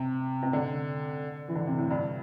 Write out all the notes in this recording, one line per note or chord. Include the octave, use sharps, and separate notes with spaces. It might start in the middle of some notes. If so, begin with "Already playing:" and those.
Already playing: C3
C3
D3
E3
D3
C3
A2
G2